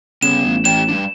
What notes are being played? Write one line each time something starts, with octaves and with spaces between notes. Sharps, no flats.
C#3 G3 B3 E7
A1
G4 C#5 G5 E7
G3 G#3 D4